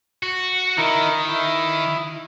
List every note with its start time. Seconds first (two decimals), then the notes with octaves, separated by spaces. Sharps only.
0.23 F#4
0.78 D#3 D#4 E4 A#4
1.29 E4